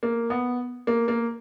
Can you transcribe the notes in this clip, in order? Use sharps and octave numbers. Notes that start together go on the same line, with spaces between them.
A#3
B3
A#3
A#3